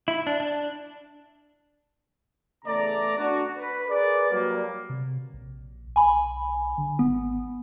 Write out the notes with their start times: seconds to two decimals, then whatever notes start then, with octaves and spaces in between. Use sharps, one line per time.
0.08 E4
0.27 D4
0.40 D4
2.65 E2 C#3 A3 D5 A#5
3.19 D4 F#4
3.57 B4
3.89 G#4 A#4 B4 D5
4.31 F#3 G3 A#3
4.90 C3
5.33 A#1
5.96 B1 G#5 B5
6.78 D3
6.99 G#1 B3